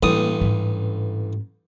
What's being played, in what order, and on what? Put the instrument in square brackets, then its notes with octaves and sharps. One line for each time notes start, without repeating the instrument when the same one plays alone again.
[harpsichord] A1 G2 D#6 [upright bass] A#3
[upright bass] G#2 C#4